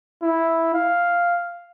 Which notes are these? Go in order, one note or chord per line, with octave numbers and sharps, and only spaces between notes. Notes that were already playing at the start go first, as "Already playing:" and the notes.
E4
F5